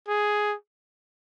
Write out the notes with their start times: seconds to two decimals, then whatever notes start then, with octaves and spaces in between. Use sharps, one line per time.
0.08 G#4